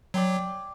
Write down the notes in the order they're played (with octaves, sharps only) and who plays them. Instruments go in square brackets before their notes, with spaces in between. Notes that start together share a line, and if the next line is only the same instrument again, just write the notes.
[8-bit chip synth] F#3 [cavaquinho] D5 G5 C6